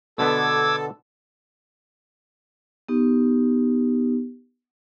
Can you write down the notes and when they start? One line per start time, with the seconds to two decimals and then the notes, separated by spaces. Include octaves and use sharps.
0.18 B2 D3 B3 A4 D6 E6 G#6
2.89 B3 D#4 G4